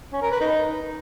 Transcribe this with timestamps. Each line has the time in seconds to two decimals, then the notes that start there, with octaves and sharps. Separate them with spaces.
0.13 C#4
0.22 A#4
0.31 B4
0.41 D#4